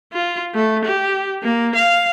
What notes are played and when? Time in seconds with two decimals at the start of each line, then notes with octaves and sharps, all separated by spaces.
0.13 F4
0.54 A3
0.85 G4
1.43 A#3
1.75 F5